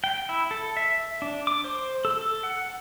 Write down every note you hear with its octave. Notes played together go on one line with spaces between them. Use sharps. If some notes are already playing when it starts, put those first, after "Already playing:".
G5
E4
A4
E5
D4
D6
C5
A4
A4
F#5